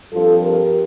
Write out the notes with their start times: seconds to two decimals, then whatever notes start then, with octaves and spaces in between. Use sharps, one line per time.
0.12 G2 F3 C4 F4 A4
0.43 G4 A#4